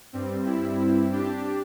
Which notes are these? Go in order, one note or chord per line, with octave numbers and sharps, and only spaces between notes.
G2 G3 C4
E4
D4 G4